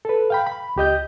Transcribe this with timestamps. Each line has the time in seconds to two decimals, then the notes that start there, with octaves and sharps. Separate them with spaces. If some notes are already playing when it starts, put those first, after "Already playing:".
0.05 A4 B4
0.30 F5 G5 B5
0.47 B5
0.76 C#2 G4 D#5 G6